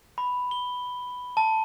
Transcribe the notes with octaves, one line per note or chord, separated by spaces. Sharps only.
B5
G7
A5